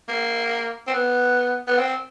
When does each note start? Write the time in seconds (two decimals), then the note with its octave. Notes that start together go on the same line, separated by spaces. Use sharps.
0.09 A#3
0.87 C4
0.94 B3
1.67 B3
1.78 C4